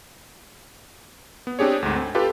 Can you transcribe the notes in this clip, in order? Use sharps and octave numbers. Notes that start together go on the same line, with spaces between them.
B3
C4 D4 G4 G#4 C#5
D2 G#2
C4
F4 G4 A4 B4